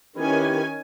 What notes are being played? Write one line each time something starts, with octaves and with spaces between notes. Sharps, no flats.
D#3 C#4 E4 G4 B4 G#5